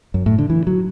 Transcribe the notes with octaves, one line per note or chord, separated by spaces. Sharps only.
F#2
A2
D3
E3
F#3